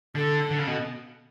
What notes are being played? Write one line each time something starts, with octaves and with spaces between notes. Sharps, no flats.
D3 A4
D3
C#3
B2